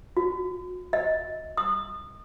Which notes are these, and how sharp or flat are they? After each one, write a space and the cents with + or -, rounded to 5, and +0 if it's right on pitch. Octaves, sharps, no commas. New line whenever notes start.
F#4 -35
D#5 +25
D#6 -30